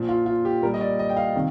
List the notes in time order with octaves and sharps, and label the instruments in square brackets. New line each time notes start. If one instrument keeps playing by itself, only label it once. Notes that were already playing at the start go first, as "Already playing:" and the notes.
Already playing: [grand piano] A#2 F3
F4
F4
G4
A#2 G3 A#4
D#5
D5
D#5
G5
F5
C3 D#3